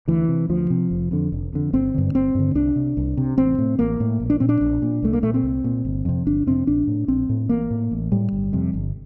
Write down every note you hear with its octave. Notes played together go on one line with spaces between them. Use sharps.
D2 E3
C3
D2 F3
C3
F1
F2 D3
F1
F2 D3
G1 C4
G2 D3
G1 C4
G2 D3
C2 D4
C3
C2
C3
A1 C4
A2
A1 A#3
A2
A#1
D4
A#2 C4
D4
A#1
A#2
C2 A3
A#3
A#2 A3
C4
C2
A#2
G1
F2 C3
G1 D4
F2 C3 C4
A#1 D4
A2
A#1 C4
A2
A1 A#3
A2
A1
A2 G3
G1
F2 C3
G1